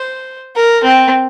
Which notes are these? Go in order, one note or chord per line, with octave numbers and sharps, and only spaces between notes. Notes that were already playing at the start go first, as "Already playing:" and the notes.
Already playing: C5
A#4
C4